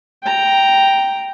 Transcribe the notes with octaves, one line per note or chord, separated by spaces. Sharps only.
G5 A#5